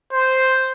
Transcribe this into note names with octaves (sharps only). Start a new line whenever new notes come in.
C5